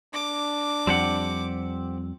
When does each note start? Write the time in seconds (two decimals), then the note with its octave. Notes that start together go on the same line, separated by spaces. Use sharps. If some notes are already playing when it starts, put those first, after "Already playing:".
0.14 D4 D6
0.87 F2 G3 C4 G4 F#5